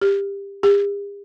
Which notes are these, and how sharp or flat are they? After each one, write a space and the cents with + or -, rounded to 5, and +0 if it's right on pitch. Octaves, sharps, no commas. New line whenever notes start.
G4 +20
G4 +45